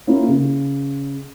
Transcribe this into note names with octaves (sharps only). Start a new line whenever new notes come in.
A#3 C#4 E4 F4 A#4
C#3